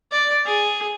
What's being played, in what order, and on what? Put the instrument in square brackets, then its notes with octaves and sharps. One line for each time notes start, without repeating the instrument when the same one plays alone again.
[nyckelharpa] D5
G#4